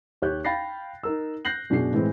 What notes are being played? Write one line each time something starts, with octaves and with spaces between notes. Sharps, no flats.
D#2 G4 C#5 F#6 G6
F5 G5 B5 A6 A#6 C7
D#4 A#4 E6
F#6 G6 A#6 C7 F#7
F#2 B2 D4 G#4 C7
A2 E3 G#3 C4